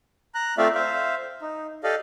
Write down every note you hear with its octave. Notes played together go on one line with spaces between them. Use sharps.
A#5 F#6
A3 C4 F4 D5 E5 F5
C5 E5 F5
D#4
G4 A4 D5 D#5 F5